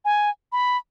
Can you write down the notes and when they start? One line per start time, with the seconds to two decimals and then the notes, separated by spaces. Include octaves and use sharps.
0.05 G#5
0.52 B5